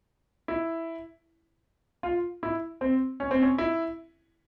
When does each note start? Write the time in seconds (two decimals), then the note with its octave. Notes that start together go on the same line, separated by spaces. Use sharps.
0.48 E4
2.03 F4
2.43 E4
2.81 C4
3.20 C#4
3.31 C4
3.42 C#4
3.58 E4